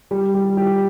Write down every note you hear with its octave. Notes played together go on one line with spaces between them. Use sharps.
G3
G3
G4